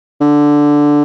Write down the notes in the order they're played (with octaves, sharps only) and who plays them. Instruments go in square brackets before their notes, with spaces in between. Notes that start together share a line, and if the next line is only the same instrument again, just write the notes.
[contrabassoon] D3